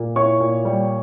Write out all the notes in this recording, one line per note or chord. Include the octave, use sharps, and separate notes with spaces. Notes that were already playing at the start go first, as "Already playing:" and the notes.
Already playing: A#2
E4 C#5 C#6
A#2
G3